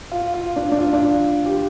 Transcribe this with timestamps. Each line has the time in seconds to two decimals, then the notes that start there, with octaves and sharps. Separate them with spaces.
0.12 F4
0.34 F4
0.56 D4
0.72 D4
0.79 F4
0.93 D4
1.01 F4
1.46 G4